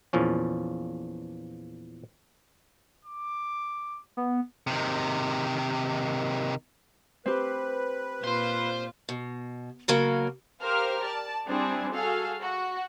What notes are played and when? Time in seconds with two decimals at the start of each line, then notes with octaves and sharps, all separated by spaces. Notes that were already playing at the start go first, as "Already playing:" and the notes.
0.13 E2 A#2 F3 C#4
3.05 D6
4.17 B3
4.67 C3 D#3
7.26 C4 G4 B4
8.24 A#2 F4 C5 C6
9.09 B2
9.88 C#3 F#3 A#3
10.62 G4 A#4 C5 F5 F6
11.03 D5 A5
11.48 G3 C4 D4 E4 G#4
11.93 F#4 G#4 A4 F5
12.42 F#4